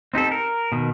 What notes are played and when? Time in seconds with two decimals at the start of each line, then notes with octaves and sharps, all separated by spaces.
0.14 C4 D#4 G4 A4
0.32 A#4
0.72 B2 D#3